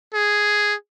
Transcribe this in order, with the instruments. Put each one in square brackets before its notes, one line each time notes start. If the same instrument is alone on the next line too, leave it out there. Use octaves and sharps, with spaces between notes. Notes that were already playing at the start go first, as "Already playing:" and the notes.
[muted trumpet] G#4